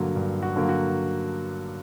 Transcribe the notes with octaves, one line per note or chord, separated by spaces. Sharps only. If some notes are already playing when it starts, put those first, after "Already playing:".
Already playing: G2 D3 F#3 A#3
G2
F#4
D3 F#3 A#3
F#4